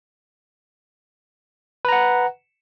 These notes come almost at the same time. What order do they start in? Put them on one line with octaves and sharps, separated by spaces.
B4 A#5 F#5